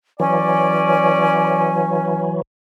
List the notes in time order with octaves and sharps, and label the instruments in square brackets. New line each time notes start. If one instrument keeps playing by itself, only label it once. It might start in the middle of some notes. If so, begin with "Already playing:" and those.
[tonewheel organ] E3 F#3 [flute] C#4 [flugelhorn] D5 [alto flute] G#5